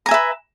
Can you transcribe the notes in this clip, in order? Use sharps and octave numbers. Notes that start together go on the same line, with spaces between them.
B4 E5 G#5 A#5